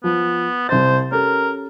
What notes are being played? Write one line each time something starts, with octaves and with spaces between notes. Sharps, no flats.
F3 B3
C2 C5 A6
C#4 G4 A4 A#4